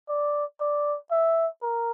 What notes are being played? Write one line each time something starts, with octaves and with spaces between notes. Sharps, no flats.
D5
D5
E5
A#4